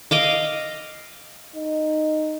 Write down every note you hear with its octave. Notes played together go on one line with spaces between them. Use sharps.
D#5 F5 D6
D#4